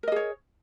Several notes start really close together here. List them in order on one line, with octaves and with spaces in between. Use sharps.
A#4 D#5 G#4 C#5